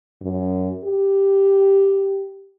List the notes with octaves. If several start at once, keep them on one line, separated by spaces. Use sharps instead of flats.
F#2
G4